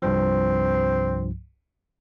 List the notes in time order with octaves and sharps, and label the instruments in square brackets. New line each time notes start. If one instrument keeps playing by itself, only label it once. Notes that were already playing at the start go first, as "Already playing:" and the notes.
[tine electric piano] C2 G2 F3 [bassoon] C4